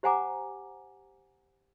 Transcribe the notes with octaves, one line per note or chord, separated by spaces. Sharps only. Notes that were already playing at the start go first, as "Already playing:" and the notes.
G4 C5 F#5 G#5 A#5 D6